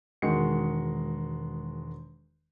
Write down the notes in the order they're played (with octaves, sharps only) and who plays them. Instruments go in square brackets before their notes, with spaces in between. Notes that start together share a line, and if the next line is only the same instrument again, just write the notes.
[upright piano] E1 D#3 G#3 F#4 C#7